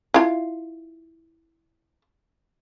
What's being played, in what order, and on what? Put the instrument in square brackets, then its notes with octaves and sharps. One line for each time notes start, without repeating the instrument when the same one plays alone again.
[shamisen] E4 F4